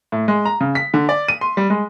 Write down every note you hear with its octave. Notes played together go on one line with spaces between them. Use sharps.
A2
G#3
A#5
C#3
B6
D3
D5
D#7
C6
G3
G#3